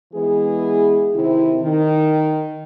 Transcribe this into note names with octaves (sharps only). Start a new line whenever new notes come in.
E3 G#3 B3 G#4
C3 D#3 E4
D#3